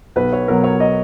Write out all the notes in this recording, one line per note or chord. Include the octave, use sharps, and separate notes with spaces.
B1 B4
C#5
B2 F#3 A#4
C#5
D#5